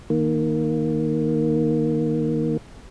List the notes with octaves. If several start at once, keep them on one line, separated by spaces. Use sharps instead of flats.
D#3 A#3